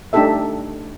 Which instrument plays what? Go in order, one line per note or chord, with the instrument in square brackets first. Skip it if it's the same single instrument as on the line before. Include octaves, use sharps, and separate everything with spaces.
[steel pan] A3 D4 D#4 G4 A4 E5